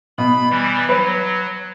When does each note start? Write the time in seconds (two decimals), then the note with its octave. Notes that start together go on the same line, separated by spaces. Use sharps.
0.18 B2 B5
0.50 E3 G3
0.89 F#3 B4